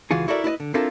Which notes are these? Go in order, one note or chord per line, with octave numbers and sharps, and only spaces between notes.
C#2 E3 F4 F#4 G#4
E4 F#4 A4 A#4 D5 E5
E4 B4 D5 D#5
D3
C4 D4 E4 F4 A4 A#4